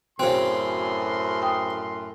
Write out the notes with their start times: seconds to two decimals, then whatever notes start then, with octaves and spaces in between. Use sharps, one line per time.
0.19 F#2 A2 C#3 C4 F#4 C#5 C6
1.42 G5 D#6